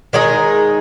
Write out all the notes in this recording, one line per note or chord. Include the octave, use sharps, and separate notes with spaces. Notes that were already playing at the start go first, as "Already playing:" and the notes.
D#3 G#3 D#4 G#4